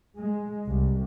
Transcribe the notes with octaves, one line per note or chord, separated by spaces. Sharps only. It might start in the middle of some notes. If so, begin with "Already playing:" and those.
G#3
C2